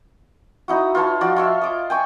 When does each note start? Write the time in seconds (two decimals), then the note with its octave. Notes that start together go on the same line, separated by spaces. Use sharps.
0.68 D#4 E4 F#4
0.95 F4 B4 C#5 A5
1.21 F3 F#4 D5
1.36 F4 C#5 E5
1.61 D#5 D6
1.90 G5 G#5 C#6